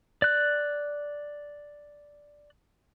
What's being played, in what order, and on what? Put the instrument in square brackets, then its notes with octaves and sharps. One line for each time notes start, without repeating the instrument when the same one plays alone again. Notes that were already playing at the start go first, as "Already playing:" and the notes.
[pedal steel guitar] D5 F#6